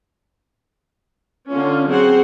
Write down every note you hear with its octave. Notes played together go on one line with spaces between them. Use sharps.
D3 C#4 F4
F#3 C4 G#4 C5 F#5